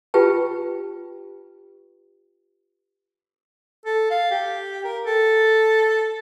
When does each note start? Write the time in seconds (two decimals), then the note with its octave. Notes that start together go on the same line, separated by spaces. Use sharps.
0.14 F4 G4 B4 G5 A5
3.86 A4
4.10 F5
4.31 G4
4.84 A#4
5.06 A4